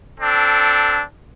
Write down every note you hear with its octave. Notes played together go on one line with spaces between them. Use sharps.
C4 D4 A4